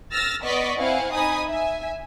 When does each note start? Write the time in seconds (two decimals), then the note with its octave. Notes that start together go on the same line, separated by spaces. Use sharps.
0.12 E6 F6 A6 A#6
0.42 B3 D5 D#5 C#6 B6
0.78 C4 E4 F5 F#5 G#5
1.13 D#4 G#5 B5 D#6
1.48 E5 G#5